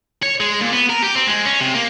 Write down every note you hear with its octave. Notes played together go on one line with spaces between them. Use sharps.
C#5
G#3
A#2
B3
A#4
G4
C4
G#3
C#4
C3
A#3